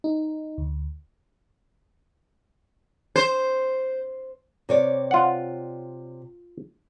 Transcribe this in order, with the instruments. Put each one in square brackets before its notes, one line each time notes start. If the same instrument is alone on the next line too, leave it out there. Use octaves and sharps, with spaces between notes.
[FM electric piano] D#4
D2
[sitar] C5
[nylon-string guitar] C3 C#5 D5
[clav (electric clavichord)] F4 F#5